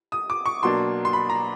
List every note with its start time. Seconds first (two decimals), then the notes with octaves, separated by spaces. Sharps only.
0.12 D#6
0.30 D6
0.46 C#6
0.63 B2 F#3 A#3 D4 C6
1.05 C6
1.13 B5
1.30 A#5